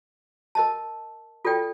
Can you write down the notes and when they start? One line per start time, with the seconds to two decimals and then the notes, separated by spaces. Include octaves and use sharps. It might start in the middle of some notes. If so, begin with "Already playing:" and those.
0.55 A#4 D#5 A5
1.45 F4 A4 D5 G5